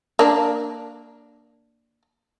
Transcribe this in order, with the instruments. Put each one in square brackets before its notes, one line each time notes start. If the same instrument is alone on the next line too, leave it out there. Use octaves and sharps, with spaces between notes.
[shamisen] A#3 D4